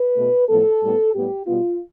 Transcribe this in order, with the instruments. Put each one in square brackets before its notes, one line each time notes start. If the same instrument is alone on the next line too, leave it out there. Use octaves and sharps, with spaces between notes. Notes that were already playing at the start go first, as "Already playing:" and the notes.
Already playing: [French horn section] B4
B2 A3
A2 F3 B3 A4
A2 G3 B3
A2 G3 B3 G4
B2 G3 B3 F4